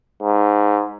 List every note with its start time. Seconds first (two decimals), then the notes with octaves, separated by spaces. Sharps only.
0.22 G#2